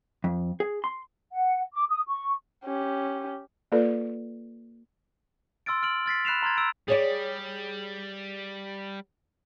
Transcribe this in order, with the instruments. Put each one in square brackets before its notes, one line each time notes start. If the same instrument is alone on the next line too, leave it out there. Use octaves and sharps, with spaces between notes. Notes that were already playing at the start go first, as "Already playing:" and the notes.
[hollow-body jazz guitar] F2
G#4
C6
[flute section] F#5
D6
D#6
C#6
[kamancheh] C#4 G4
[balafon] A#3 F4 A4 B4 D5
[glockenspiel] C6 E6 F6 A6 D7
F6 D7 F#7
F6 A6 B6 C7
B5 F#6 C7 E7 F7
A#5 C6 F6 G#6 A6
E6 D7
[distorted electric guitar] G3 [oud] G#4 C#5 D5